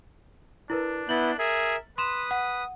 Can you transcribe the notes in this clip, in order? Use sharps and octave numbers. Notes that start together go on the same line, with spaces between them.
D4 E4 A#4 B4
B3 E4 G6 A6 F#7
G#4 A#4 E5
B4 C6 D#6 E7
F#5